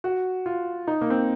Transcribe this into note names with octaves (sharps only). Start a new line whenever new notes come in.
F#4
F4
D#4
A#3
C4